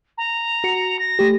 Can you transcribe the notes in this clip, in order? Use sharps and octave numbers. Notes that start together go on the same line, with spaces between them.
A#5
F#4 C#7
A#6
A3 G4